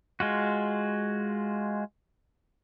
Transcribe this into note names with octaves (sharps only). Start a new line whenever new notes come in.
G#3 F4 F#4